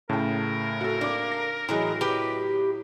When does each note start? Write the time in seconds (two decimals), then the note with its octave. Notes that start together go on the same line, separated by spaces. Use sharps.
0.09 A2 C#3 A#4 G5 A5
0.81 F#4 A4
1.01 A#3 D4 D6
1.32 A#6
1.69 A2 E3 F#3 G#3 A#5
2.01 G4 B4